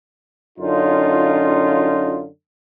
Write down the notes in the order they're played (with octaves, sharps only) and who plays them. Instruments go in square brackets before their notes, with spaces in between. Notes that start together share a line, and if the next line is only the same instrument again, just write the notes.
[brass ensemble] F#2 D3 C#4 D#4 F4